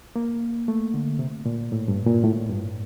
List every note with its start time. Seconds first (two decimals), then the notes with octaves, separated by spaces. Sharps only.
0.16 A#3
0.68 A3
0.94 D3
1.19 C3
1.46 A#2
1.72 A2
1.88 G2
2.06 A#2
2.23 A2
2.50 G2